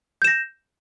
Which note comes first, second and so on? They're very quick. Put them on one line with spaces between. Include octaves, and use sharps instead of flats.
G6 E7 A#6